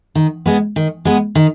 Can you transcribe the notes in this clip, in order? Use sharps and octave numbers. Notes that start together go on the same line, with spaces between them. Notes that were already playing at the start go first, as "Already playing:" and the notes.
D#3
G#3 B3
D#3
G#3 B3
D#3